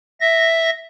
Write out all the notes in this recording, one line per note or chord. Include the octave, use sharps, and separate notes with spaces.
E5 A#6